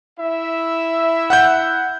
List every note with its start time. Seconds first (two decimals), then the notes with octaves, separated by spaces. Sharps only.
0.19 E4 E5
1.30 F#5 F#6 G6